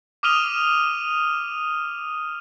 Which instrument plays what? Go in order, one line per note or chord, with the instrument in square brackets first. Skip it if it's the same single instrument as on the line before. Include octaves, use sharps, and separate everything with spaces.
[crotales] D6 D#6 F6 D#7 F7 G7